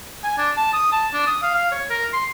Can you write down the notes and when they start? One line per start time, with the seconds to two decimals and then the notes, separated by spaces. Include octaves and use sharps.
0.24 G#5
0.38 D4
0.57 A5
0.73 D#6
0.92 A5
1.13 D4
1.27 D#6
1.43 F5
1.55 F5
1.72 C#5
1.90 A#4
2.13 C6